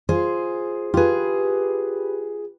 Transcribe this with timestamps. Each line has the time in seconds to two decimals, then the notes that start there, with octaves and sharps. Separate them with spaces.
0.09 F4 G#4 C5
0.94 F4 G4 G#4 B4